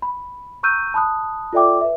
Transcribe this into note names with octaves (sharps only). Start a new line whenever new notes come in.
B5
A#5 C#6 E6 F#6 G6 D#7
A5 B5 D#6 F#6
F4 A4 D5 E5 G5 D6
B4 E5